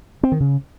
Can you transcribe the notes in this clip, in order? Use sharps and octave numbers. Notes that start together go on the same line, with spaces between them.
C4
D#3
C#3